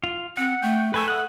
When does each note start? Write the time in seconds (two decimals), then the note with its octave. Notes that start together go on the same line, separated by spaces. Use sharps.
0.04 F4
0.37 C4 F#5
0.62 A3 G5
0.94 A3 A4 B4 G#5 E6
1.08 E5 F#5 D#6 F#6